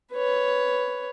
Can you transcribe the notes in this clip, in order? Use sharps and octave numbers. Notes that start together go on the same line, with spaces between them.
B4 C#5